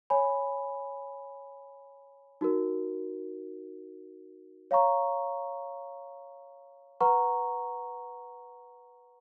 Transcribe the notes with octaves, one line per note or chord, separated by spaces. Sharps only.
C#5 G#5 B5
D#4 F#4 A#4
C#5 F5 A#5 C#6
B4 F#5 A#5 C#6